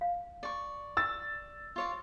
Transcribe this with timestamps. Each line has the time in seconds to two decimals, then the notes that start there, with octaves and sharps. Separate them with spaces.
0.01 F5
0.43 D5 C#6
0.97 E6 A6
1.76 F4 C#5 D5